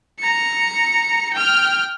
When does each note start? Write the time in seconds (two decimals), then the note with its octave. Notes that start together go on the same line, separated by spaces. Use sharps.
0.19 A#5 C#7
1.34 G5 F6